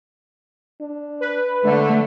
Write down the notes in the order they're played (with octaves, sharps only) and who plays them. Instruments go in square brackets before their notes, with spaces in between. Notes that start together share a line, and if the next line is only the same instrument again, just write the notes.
[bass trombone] D4
[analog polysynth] B4
[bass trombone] D3 [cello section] A3